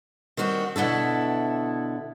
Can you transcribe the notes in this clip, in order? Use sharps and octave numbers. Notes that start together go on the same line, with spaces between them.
D#3 G3 C4 F#4
B2 D3 E4 A4